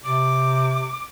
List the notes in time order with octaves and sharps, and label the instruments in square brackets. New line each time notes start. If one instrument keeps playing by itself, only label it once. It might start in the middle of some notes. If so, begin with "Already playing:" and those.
[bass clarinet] C3 [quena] D6